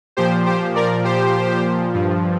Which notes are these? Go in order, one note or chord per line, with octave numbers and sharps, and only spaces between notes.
A#2 F3 G4 C5
G4 C5
A#4 D5
G4 C5
G2 F3